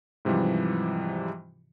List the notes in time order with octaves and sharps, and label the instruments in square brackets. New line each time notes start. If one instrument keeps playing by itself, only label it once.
[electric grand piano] G#2 C3 E3 F3 G3